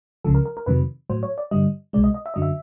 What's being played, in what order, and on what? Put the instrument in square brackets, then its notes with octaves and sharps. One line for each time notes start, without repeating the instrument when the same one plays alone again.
[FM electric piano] C#2 C#3 F3 A4
A#4
A#4
A#4
F2 C3 D#3 F#3 B4
A2 F#3 C5
C#5
D5
G2 D3 G3 D#5
C2 B2 G#3 D5
D#5
D#5
E5
F#2 D3 F#3 D#5
E5